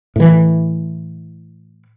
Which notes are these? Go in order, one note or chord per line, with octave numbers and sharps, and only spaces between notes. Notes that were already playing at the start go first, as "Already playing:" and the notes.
A2 E3